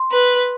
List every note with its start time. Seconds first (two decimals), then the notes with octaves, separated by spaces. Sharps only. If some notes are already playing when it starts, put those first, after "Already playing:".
Already playing: C6
0.12 B4